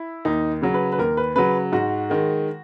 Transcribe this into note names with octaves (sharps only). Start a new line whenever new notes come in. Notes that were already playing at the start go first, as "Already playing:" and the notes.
Already playing: E4
D#2 D#4
C#3 F#3
B4
B4
D#2 A#4
B4
C#3 F#3 B4
G#2 F#4
D#3 G#3